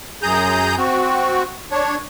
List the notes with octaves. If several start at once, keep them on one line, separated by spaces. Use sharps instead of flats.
F#2 G#4 A#5 D#6 G6
C4 F#4
D4 C#5